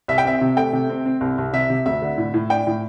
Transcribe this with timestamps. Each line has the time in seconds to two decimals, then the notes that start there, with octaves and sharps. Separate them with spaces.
0.08 C2 E5
0.18 G5
0.25 C4 E5
0.41 C3
0.57 A3 G5
0.73 C3
0.90 C4
1.06 C4
1.21 C2
1.38 C2
1.53 C3 E5
1.70 C3
1.86 D2 E5
2.02 D3
2.18 A2
2.34 A2
2.50 D4 G5
2.67 A2